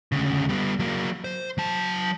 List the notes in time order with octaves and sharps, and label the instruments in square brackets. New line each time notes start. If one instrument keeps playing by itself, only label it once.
[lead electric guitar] D2 C#3
G3 B3
F#3 A#3
C5
F#3 A5